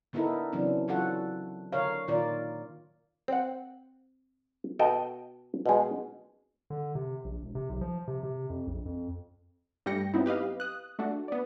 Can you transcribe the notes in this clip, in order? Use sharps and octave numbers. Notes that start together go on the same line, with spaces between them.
D3 B3 D#4 E4 A4 A#4
C#3 E3 F#3 C4 D4
E3 F#3 F4 F#4 A4 F#5
D3 A#4 C#5 F5
A#2 D#3 F4 A#4 D5
C4 F#5
B2 A4 D#5 G5
B2 G#3
D3
C3
A#1
E1
C3
B1
F3
C3
C3
F2
A#1
F2
G2 G3 A3 G5 A#6 C#7
F#3 B3 C4 D#4 E4
G4 B4 D#5 F5
D#6 F#6
A3 D4 F#4
B3 D5